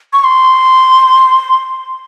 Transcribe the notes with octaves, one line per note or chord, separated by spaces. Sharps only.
C#6
C6